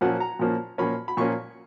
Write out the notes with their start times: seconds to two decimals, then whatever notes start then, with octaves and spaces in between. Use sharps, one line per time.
0.01 A#2 F3 A#3 C#4 F#5
0.20 A#5
0.39 A#2 F3 A#3 C#4
0.78 A#2 F3 A#3 C#4 B5
1.08 B5
1.17 A#2 F3 A#3 C#4 C#6